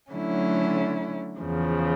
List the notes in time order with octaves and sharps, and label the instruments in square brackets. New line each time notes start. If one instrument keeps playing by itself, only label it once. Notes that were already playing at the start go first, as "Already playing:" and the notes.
[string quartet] D3 F#3 A3 C#4 E4
E2 C#3 F3